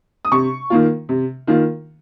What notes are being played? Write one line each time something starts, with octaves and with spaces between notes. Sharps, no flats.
D#6
C3 C#6
D#3 A#3 F4
C3
D#3 A#3 F4